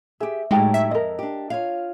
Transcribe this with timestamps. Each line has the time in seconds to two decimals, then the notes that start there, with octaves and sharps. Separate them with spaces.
0.20 G4 G#4 E5
0.51 A2 F#3 G#3 D#4 G4 G5 A#5
0.74 E5
0.91 F2 G#2 A#4 D#5
1.19 D4 G4
1.50 F4 C#5 F5